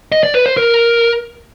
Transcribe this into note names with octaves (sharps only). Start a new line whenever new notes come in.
D#5
D5
B4
C5
A#4